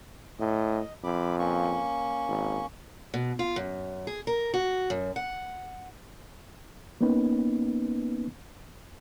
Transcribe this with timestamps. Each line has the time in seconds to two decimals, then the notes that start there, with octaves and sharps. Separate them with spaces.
0.39 A2 D#5
1.04 F2 B5 D6
1.39 A#3 C#4 C#6
2.28 G#1
3.14 B2
3.39 F4
3.56 F#2
4.07 G#4
4.27 A#4
4.54 F#4
4.90 F#2
5.16 F#5
7.01 A#3 B3 C#4 D#4 B4